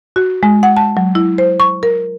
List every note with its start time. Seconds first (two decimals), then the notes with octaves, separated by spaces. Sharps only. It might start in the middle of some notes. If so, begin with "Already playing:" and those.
0.16 F#4
0.43 G#3
0.63 F#5
0.77 A5
0.97 F#3
1.15 E4
1.38 C5
1.60 C#6
1.83 A#4